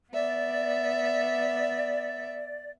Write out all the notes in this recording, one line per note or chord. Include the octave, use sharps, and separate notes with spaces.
B3 D5 E5